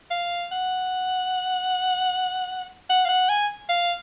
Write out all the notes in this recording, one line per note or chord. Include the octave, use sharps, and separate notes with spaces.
F5
F#5
F#5
F5
F#5
G#5
F5